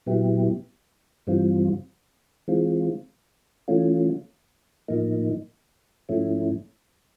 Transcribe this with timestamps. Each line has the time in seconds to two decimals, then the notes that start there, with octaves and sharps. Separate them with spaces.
0.06 A#2 F#3 B3 E4 G4
1.27 G2 E3 G3 C4 F4
2.48 E3 G#3 C4 F4
3.68 E3 A3 C#4 F4
4.88 A2 F3 A#3 D#4
6.09 G#2 F3 A3 C#4 E4